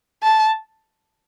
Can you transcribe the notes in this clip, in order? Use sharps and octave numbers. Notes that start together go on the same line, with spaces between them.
A5